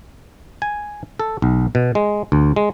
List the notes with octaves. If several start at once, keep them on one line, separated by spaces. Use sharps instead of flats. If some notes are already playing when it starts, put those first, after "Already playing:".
G#5
A4
B1
B2
G#3
D2
G#3